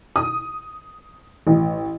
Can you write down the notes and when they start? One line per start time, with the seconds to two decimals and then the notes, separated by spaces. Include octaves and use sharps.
0.16 D#6
1.47 A1